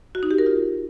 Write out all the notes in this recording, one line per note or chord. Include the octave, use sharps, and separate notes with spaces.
F#4
D#4
G4
A#4
F4